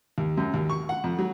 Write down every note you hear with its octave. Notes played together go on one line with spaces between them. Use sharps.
D#2
F#2
D#2
C#6
F#5
F2
F#3